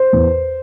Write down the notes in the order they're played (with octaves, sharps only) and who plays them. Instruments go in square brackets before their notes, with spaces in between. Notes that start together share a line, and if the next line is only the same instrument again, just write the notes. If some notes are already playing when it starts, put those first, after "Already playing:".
Already playing: [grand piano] C5
E2